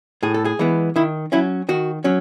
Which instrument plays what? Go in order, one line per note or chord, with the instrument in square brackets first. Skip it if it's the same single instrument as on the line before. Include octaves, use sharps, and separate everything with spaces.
[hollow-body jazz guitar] A2 G#4
A4
G#4
E3 G#3 B3
D#3 E4
F#3 C#4 E4
D#3 F#4
F#3 C#4